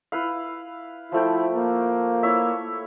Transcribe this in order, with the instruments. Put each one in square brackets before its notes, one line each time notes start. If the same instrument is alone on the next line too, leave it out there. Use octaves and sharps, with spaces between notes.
[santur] E4 B4 F5
[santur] F3 A3 G5 [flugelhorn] E4
[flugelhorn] A#3
[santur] E4 C#5 E5